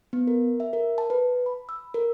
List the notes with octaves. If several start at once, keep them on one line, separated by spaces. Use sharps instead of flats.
B3
A#4
E5
A#4
A5
B4
B5
E6
A#4